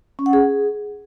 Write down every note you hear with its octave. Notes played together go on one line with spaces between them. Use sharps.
C#4
F#5
G#4